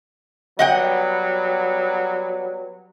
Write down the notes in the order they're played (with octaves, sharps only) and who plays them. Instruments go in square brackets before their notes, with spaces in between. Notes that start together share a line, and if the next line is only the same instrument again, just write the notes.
[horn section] F#3 G3 B3 [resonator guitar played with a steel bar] D#5 F#5 G5